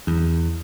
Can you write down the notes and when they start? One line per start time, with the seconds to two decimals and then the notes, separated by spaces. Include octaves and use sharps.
0.07 E2